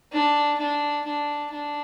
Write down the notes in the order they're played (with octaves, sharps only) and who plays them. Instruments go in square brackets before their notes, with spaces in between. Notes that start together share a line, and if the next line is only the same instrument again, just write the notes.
[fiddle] D4
D4
D4
D4